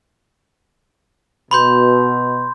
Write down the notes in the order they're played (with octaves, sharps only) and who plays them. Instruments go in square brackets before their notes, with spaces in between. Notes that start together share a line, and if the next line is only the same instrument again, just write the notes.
[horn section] B2 [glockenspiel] B5 C6 G6